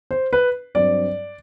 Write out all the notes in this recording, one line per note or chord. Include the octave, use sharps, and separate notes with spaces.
C5
B4
G2 F#3 C4 D5